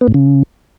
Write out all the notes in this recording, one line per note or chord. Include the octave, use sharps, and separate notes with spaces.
B3
A2
C#3